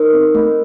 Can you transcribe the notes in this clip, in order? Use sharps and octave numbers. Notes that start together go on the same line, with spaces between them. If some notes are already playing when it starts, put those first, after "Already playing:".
Already playing: D#4 A#4 C5
C4
A3